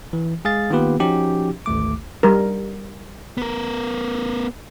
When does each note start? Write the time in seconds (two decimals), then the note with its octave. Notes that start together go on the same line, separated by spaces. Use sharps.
0.13 E3
0.45 G#3 G#4 F5 A6
0.70 D#3 A#3 B3 F4 G4 B4
1.00 F3 C#4 D#4 F#4 G4
1.66 G#1 D2 A3 D6
2.23 G3 A#4
3.37 B3 A#4